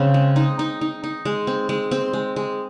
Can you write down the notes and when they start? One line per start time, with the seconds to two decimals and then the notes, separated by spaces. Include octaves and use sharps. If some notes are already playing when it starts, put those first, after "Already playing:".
Already playing: C#3 C4
0.14 G#3
0.36 D#4
0.59 D#4
0.81 D#4
1.04 D#4
1.25 G#3
1.47 C4
1.69 G#3
1.91 C4
2.13 G#3
2.36 G#3